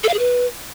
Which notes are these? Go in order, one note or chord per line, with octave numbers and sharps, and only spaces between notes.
A4
F5
G#4
B4